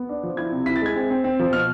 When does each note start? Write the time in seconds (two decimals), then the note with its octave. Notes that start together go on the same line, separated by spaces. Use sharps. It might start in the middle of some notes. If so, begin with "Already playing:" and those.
Already playing: B3
0.09 D4
0.23 F3
0.37 E4 G#6
0.52 C3
0.66 E4 B6
0.76 A6
0.82 G#3 G#6
0.96 C4
1.10 C4
1.24 C4
1.39 F3
1.53 B2 F6